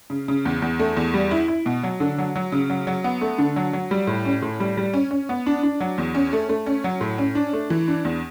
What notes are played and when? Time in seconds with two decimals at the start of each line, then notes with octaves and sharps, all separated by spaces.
0.10 C#3
0.28 C#3
0.45 E2
0.62 E2
0.79 A3
0.97 E2
1.14 G3
1.31 E4
1.48 E4
1.66 B2
1.83 F#3
2.00 D3
2.18 F#3
2.36 F#3
2.52 C#3
2.70 F#3
2.87 F#3
3.04 B3
3.21 A3
3.38 D3
3.56 F#3
3.73 F#3
3.91 G3
4.07 A2
4.25 C#4
4.42 A2
4.60 G3
4.77 G3
4.94 C#4
5.11 C#4
5.29 B3
5.46 D4
5.63 D4
5.80 F#3
5.98 E2
6.15 C#4
6.33 A3
6.49 A3
6.66 C#4
6.84 F#3
7.01 A2
7.18 C#4
7.35 D4
7.53 A3
7.70 E3
7.88 D4
8.05 E2